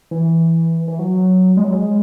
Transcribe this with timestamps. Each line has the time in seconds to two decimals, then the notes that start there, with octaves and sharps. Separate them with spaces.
0.11 E3
0.88 E3
0.99 F#3
1.57 G#3
1.64 F#3
1.72 G#3